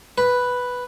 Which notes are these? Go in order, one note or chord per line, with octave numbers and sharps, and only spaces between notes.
B4